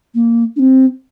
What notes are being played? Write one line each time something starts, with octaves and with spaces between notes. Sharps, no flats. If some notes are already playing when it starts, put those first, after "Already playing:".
A#3
D4
C4